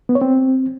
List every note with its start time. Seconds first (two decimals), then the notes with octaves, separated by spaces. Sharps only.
0.09 B3
0.15 C#5
0.21 C4